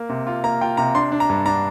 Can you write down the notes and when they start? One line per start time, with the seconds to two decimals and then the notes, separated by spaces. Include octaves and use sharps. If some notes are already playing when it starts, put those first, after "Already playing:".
Already playing: A#3
0.09 C3
0.27 F4
0.44 A#3 A#5
0.61 F4 G5
0.77 C3 A#5
0.94 D4 C6
1.12 D4
1.20 A#5
1.30 G2
1.46 D4 A#5